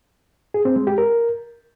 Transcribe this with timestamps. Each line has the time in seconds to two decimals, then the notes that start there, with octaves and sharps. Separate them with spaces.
0.54 G#4
0.65 C4
0.76 G#3
0.87 G4
0.98 A#4